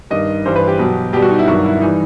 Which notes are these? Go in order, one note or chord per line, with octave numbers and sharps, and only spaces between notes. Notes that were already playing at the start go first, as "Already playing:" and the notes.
G2 D#3 G3 D#5
G2 E3 G3 C5
B4
G4
B2 F#3
B2 G3 G4
F#4
D#4
E4
G2 D#3 F#3 F#4
E4
E3 G3 D#4